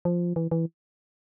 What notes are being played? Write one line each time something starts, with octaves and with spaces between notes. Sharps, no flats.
F3
E3
E3